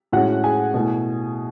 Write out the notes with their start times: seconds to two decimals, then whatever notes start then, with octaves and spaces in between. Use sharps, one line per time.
0.12 A2 G#3 C#4 F#4 F#5
0.44 G#4 G#5
0.74 B2 A3 E4